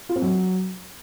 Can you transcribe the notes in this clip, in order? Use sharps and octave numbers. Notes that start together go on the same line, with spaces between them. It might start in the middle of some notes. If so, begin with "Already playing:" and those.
F4
C4
F#3